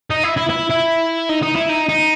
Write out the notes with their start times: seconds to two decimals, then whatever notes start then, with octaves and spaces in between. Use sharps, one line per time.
0.10 D#4
0.24 E4
0.37 E4
0.50 E4
0.70 E4
1.29 D#4
1.42 D#4
1.55 E4
1.69 D#4
1.89 D#4